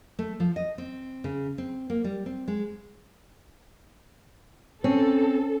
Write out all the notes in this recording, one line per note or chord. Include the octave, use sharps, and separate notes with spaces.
A3
F3
D#5
C4
C#3
C4
A#3
G3
C4
G#3
C4 C#4 A4